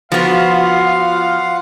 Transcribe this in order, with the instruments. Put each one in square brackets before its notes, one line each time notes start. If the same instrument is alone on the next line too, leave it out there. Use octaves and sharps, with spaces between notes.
[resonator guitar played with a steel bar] F3 B3 [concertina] F4 F#5 [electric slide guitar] F#4 [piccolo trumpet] F5